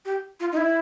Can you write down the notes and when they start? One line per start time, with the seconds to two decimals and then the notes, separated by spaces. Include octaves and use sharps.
0.05 G4
0.40 F4
0.52 D#4
0.57 E4